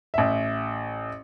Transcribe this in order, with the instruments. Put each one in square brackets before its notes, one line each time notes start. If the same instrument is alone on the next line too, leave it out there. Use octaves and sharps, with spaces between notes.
[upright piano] A1 E5